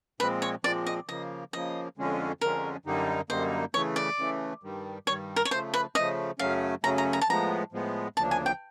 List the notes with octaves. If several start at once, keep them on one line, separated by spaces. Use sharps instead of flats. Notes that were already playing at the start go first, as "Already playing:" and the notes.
A#2 F3 G#3 C4 B4
C#5
A#2 F3 G#3 C4 D5
D#5
C#3 F3 A#3 D#5
C#3 F3 A#3 D#5
F2 D3 F3 G#3 C#4
F2 D3 F3 G#3 C#4 A#4
F#2 D3 G3 A#3 D#4
F#2 D3 G3 A#3 D#4 C5
C#3 E3 A3 C#5
D5
C#3 E3 A3
G2 D#3 G3
G2 D#3 G3 C#5
A#4
C#5
C#3 F3 A3 C5
B4
C#3 F3 A3 D#5
F#2 C#3 F#3 A3 C#4 F5
F#2 C#3 F#3 A3 C#4 A#5
A#5
A#5
A5
A2 F3 G#3 B3 A#5
A2 F3 G#3 B3
D2 C#3 F3 A#3 D4 A5
G#5
G5